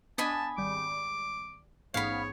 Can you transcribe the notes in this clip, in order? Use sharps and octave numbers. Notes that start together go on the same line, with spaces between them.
B3 D4 D#5 G#5 A5 B5
G#1 G3 D6
A1 G#2 B3 C#5 F5 B5